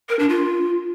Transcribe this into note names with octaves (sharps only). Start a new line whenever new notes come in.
A#4
D4
F4